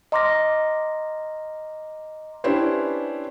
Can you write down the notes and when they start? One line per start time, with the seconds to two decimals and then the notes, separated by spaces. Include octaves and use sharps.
0.12 D#5 A#5 C6 D6 F6 A#6
2.44 C#4 D4 E4 G4 B4 C5